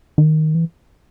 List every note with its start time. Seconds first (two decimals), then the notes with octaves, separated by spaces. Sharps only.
0.18 D#3
0.55 E3